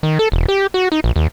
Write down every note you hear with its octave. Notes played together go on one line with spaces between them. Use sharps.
D#3
A4
E1
G4
F#4
D#4
A#1
D#2